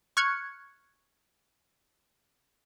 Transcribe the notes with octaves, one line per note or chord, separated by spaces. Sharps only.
C#6 F6 F#6 G#6 C#7